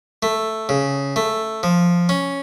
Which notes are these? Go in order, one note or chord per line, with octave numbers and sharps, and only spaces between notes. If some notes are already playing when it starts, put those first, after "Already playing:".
A3
C#3
A3
F3
C#4